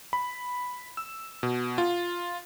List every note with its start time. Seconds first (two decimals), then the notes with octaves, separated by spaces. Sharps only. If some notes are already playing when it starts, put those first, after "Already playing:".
0.13 B5
0.97 E6
1.43 B2
1.78 F4